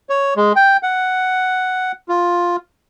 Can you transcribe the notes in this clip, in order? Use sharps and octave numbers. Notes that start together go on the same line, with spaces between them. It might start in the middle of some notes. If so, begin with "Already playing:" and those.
C#5
G#3
G5
F#5
F4